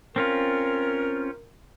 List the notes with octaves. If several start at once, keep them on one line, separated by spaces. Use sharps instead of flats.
C4 C#4 F4 A#4